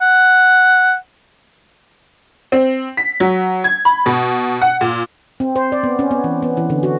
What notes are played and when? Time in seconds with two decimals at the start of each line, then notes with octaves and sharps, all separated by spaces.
0.02 F#5
2.52 C4
2.97 B6
3.20 F#3
3.64 G#6
3.85 B5
4.06 B2
4.61 F#5
4.81 A#2
5.40 C4
5.56 C5
5.72 D5
5.83 B3
5.99 C#4
6.11 B3
6.24 E3
6.42 B3
6.57 E3
6.70 D3
6.83 F#4